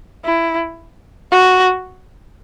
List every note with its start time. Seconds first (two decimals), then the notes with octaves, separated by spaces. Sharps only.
0.24 E4
1.31 F#4